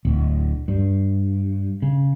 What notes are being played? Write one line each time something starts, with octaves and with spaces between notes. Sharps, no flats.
D1
G2
C#3